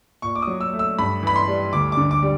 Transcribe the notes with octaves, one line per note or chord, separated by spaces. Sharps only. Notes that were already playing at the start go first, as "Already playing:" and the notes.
A#2 C#6
D6
D#6
F#3
E6
A3
E6
G2 B5
E3 B5
C6
G3
D2 D6
D6
D3
D6
G3